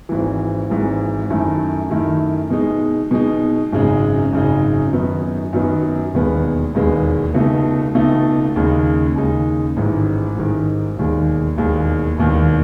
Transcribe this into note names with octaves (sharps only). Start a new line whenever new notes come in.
G#1 G#2 E3
G#1 G#2 E3
F#2 D#3 A3 E4
F#2 D#3 A3 E4
B2 G#3 D#4
B2 G#3 D#4
G#1 F#2 C#3 G#3 D#4
G#1 F#2 C#3 G#3 D#4
F#2 D#3 F#3 B3 D#4
F#2 D#3 F#3 B3 D#4
E1 D#2 D#3 G#3 B3
E1 D#2 D#3 G#3 B3
C#2 B2 A3 D#4
C#2 B2 A3 D#4
D#2 C#3 G#3 D#4
D#2 C#3 G#3 D#4
A1 G#2 D#3
A1 G#2 D#3
E1 D#2 D#3 G#3
E1 D#2 D#3 G#3
E1 D#2 D#3